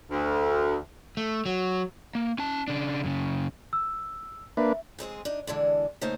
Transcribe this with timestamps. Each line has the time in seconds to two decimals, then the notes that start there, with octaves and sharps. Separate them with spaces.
0.10 D2
1.17 A3
1.46 F#3
2.15 A#3
2.39 C#4 A5
2.68 C#3 D4
3.04 F#2 C#3
3.73 E6
4.57 A#3 D4 B4 E5
4.99 G#2 G#3 C4 G#4
5.25 D4 D#4
5.47 D3 E3 G#3 D4
6.01 C#3 A3 A#3 D#4 C5